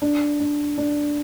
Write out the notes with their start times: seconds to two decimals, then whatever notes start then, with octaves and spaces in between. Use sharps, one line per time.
0.02 D4
0.40 D4
0.78 D4